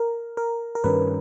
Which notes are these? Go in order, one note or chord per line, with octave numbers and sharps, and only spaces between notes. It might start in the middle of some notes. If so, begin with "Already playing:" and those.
Already playing: A#4
A#4
A#4
G2 D#3 G3 C#4 B4